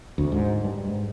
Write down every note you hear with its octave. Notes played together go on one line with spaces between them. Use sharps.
D2
G#2
G2
G#2